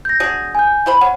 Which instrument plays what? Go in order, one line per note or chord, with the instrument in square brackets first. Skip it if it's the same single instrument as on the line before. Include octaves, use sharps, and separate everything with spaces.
[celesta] G6 A#6
[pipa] F#3 D4 G#4
[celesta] G#5 G6
[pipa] E4 C5 B5
[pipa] C#4 [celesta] F#5